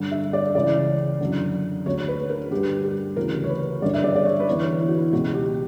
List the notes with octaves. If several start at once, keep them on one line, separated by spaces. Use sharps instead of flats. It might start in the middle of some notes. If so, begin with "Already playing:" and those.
Already playing: G2 D3
E5
D5
C#2 C#3 E3 D5
F#2 D3
D2 D3 C#5
B4
A#4
G2 D3 G4
G4
D2 C#3 E3 A#4
C#5
B4
G2 D3 D5
E5
D5
D5
C#5
B4
E2 D3 C#5
E4
F#4
E4
C#2 B2 F#4
G4